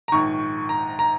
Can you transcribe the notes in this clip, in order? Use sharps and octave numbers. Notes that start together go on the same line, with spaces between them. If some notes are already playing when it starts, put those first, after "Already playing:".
A#5
A#1 G#2 D#3 C#6
A#5
A#5